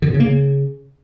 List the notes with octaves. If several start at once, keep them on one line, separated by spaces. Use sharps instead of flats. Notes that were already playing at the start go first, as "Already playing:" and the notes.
D3
B2
C#3
A#3
C#3